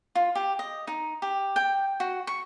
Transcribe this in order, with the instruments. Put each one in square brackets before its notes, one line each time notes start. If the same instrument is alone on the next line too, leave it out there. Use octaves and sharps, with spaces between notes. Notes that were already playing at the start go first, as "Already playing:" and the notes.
[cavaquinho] F4
G4
D#5
D#4
G4
G5
F#4
C#6